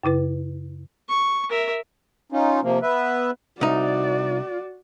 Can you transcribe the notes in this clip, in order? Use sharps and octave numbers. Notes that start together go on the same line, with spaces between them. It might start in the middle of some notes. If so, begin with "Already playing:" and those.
F#2 C#3 E4 B4
C#6
A#4 E5
C#4 D#4 F4
C3 F3 A#3
B3 B4 E5
C2 D#4 F#4 D5